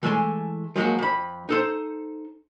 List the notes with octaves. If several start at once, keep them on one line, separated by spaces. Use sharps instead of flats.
E3 G#3 A3 B4 G#5 C6
F3 F#3 G#3 A#3 F#4
F2 B5
D#4 A4 C5